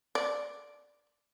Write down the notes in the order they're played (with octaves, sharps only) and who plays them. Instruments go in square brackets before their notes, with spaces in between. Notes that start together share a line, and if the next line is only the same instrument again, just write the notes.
[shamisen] D5